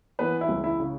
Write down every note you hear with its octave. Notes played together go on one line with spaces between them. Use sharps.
E3 B3 B4
E4
C#2
E4
C#3